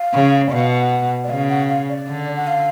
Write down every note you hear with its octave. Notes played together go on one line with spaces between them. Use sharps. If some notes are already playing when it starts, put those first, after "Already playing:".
Already playing: F5
C#3
D5
B2 F5
F#5
D5
C#3 F5
F#5
F5
D5
D3
F#5
F5